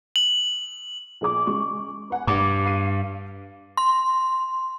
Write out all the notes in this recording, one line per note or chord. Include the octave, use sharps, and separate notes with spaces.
F#7
A#1 G#4 D6
C#3 G#3 C#6
B4 F#5 G#5
G2 D6
F5 C7 D#7
C6